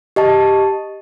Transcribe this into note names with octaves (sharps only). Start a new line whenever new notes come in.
G4 D#5 A5